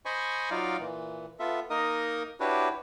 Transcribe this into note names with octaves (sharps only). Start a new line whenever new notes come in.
C5 D#5 G#5 B5 C#6
F#3 D#4 F4 D5 F5
A#2 E3
B3 F4 A4 E5
A#3 D#4 A#4 D#5 D#6
D4 E4 F#4 G4 B4 C#5